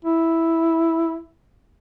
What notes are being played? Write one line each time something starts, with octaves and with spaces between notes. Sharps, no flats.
E4